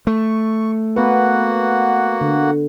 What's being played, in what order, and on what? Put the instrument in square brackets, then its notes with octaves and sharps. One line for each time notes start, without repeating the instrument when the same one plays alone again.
[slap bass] A3 [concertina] C#6
[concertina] A#3 F#4 F#5 [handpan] B3 B4
[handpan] D3